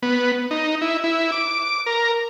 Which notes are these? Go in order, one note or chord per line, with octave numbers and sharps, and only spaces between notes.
B3
D#4
E4
E4
D6
A#4